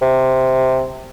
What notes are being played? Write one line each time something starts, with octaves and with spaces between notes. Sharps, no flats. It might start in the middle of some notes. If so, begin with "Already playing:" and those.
C3